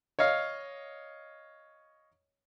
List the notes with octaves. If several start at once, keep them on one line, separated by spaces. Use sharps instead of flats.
C#5 D#5 F5